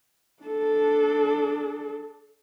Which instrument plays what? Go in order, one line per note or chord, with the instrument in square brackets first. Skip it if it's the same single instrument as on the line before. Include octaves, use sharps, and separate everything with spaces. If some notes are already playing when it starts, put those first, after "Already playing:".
[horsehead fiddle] D4 A4